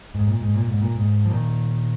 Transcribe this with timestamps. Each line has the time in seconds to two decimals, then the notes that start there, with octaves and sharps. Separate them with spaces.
0.15 G#2
0.28 A#2
0.41 G#2
0.55 A#2
0.67 G#2
0.82 A#2
0.95 G#2
1.26 F3
1.30 A#2 D#3